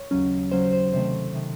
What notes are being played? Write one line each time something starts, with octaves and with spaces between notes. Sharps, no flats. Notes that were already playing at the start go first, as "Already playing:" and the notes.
Already playing: C#5
D#2 C#3 F#3 C#4
D#2 C#3 F#3 C#4 C5
C5
C3 D#3 A3 C5
C3 D#3 A3